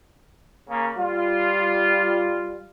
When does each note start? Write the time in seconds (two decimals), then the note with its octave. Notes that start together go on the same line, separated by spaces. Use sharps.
0.70 C#3 A#3
0.98 G3 F4